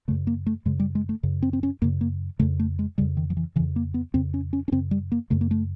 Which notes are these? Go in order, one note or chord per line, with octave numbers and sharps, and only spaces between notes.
F#2 C#3 A3
A#3
A3
F#2 C#3 G#3
G3
G#3
A3
F#2 C#3
C4
C4
C#4
F#2 C#3 A#3
A#3
F2 C#3 A3
A3
G#3
F2 C#3 G3
D#3
F3
E3
F2 C#3 E3
A#3
B3
F2 C#3 C4
C#4
C#4
C#4
F#2 C#3 C4
G3
A#3
F#2 C#3 A3
A#3
A3